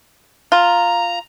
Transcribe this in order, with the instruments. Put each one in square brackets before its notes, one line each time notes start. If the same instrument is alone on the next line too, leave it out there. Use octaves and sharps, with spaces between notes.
[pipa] F4 [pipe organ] A#5